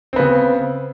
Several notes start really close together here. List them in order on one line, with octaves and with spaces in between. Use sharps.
C4 B3 C#3